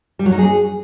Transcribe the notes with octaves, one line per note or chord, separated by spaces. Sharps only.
G3
F#3
D#4
G#4